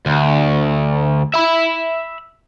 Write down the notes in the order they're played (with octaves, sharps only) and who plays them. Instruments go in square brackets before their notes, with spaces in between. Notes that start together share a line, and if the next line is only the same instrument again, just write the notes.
[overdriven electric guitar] D2
E5 B5